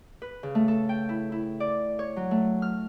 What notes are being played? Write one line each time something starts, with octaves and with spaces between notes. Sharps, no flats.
B4
C#3
A3
A4
G5
E4
E4
D5
C#5
F#3
A3
F6